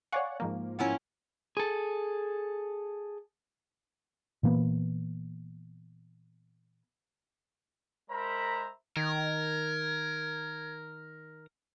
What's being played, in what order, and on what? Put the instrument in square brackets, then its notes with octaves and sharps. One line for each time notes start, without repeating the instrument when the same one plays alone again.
[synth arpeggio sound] C#5 D5 F#5 [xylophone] F5 G#5 C#6
[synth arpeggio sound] G#2 F3 A#3
[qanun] C#4 E4 F4 [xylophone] F#5 A#5
[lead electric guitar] G#4 A4
[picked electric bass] A#2 E3 A#3 B3
[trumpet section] G#3 A#4 C5 E5 A#5 B5
[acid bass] D#3 [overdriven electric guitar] A#4 [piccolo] G#6